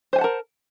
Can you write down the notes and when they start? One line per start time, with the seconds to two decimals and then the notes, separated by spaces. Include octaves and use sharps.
0.13 C5
0.16 G#5
0.18 F#5
0.21 A5
0.24 A#4